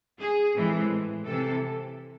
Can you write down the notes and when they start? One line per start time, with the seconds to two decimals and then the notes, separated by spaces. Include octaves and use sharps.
0.19 G#4
0.55 A2 E3 G#3 C4
1.27 C3 E3 C4 A4